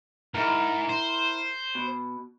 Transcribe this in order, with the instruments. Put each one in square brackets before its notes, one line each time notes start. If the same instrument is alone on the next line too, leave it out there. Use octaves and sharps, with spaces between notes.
[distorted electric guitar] G#2 [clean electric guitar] E4 A#4
[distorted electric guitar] C5
[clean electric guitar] B2